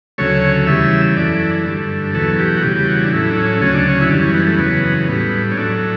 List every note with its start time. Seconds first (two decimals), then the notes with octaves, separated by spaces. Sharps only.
0.18 D2 C#3 F#3 A3 C#5
0.67 E2 C#3 G3 E5
1.16 F#2 E3 A3 D5
1.65 G2 D3 A3
2.14 E2 B2 F#3 A3 A4
2.38 G4
2.57 F#4
2.63 E2 C#3 G3 G4
2.76 G4
2.88 F#4
3.04 D4
3.12 A2 F#3 A3 E4
3.31 D4
3.37 C#4
3.61 D2 C#3 F#3 C#4
3.75 D4
3.89 C#4
4.01 E4
4.10 F#2 E3 G3 D4
4.23 C#4
4.34 B3
4.47 A3
4.59 E2 C#3 F#3 B3
5.08 A2 G3 B3
5.51 C#4
5.57 A2 F#3 A3 D4